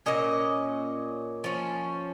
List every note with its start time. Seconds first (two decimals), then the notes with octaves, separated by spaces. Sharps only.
0.06 A#2 A#3 C#4 D#5
1.44 F3 C#4